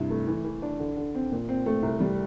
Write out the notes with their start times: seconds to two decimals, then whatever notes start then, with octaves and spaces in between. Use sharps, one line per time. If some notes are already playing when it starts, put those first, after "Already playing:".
Already playing: G2 C3 E4
0.10 A3
0.27 E3
0.45 E3
0.62 D4
0.79 D3
0.97 D3
1.15 C4
1.32 A#2
1.49 C4
1.66 A3
1.83 C2
2.00 G3